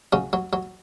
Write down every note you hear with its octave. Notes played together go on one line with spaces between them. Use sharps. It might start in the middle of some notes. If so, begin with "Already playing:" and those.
C#3 F#3
F#3
F#3